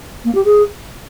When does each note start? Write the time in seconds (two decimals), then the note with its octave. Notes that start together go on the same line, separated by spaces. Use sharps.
0.25 A#3
0.35 G4
0.45 G#4